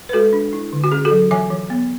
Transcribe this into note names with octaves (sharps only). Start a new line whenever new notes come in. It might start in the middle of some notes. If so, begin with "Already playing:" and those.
B4
G#3 F#4 A4
D4
E4
D3
F#4
C#4 G#4
F#4 A4
F#3
E3 E5 G#5
E3
B3